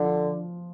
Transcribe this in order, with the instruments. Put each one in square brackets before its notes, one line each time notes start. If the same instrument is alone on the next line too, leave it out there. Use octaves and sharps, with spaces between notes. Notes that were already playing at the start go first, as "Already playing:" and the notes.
Already playing: [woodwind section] D3 [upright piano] F3